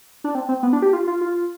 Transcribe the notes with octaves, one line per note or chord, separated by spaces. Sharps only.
D4
C4
C4
B3
D4
G4
F4
F4
F4